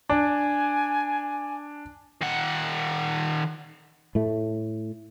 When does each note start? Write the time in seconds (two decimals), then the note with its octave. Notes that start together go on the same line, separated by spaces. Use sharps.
0.09 D4 G#5
2.21 D#3 F#5
4.15 A2 A3